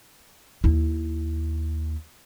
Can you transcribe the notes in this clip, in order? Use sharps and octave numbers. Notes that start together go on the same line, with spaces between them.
D#2 E4